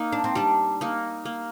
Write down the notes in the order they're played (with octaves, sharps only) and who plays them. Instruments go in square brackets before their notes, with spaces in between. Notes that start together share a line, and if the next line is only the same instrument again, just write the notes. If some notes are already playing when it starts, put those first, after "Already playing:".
Already playing: [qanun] A#3 D#4
[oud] D4
C4
[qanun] G3 [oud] D4
[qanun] A#3 D#4
A#3